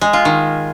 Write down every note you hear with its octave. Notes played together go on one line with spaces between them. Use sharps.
G#3
F4
D#3